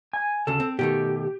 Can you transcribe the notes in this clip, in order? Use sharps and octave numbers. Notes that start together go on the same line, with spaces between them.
G#5
D2 C#3 A4
C4
B2 D#3 A3 G4